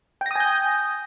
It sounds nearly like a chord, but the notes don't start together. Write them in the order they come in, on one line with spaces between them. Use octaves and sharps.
G5 A#6 D#6 G#5 G6